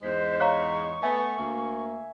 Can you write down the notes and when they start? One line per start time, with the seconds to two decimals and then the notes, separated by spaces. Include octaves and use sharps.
0.03 E2 G#2 G#3 C5 B6
0.40 C#5 F5 A#5 C#6
1.03 A3 B3 E5 G#5
1.38 D2 A#3